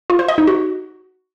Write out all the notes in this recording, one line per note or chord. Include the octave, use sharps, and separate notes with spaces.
F4
C5
D#5
D#4
F#4